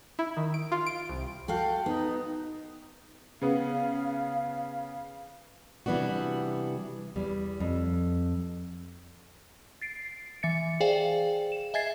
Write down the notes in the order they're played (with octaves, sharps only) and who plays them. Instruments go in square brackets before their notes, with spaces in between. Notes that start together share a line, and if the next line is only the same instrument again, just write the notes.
[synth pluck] E4
D#3
D7
F4
D7
C2
[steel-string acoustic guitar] F#4 A4 F5 [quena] G5
[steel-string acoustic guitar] B3 [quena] D#4
[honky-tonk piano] C#3 B3 [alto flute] F5
[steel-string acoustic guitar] C3 E3 G3 B3 D4 F#4
E2 G3
F2
[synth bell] A6 C7 D7
E3 E5 A6 C#7
G#4 C5 D5 F5 G5 G#5
E7
D#5 E5 G#5 G#6 A6 C7